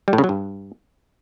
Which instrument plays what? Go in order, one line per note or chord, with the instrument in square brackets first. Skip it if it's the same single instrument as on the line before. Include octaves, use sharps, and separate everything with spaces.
[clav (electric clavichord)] G3
A2
C#3
F#3
G2